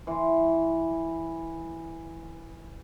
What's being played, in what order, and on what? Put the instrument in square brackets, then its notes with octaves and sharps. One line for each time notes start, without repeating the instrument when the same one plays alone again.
[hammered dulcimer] E3 C6